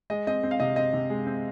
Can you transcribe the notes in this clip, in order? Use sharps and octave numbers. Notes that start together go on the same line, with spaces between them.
G#3 D#5
C4 D#5
C4
F5
C3 D#5
C4 D#5
C3
G#3
C4